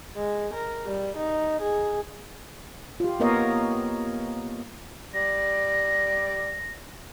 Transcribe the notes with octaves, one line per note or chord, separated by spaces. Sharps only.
G#3
A#4
G3
D#4
G#4
F4 G4
A#3 B3 A#4 C#5 D#5 F5
G3 D5 A#6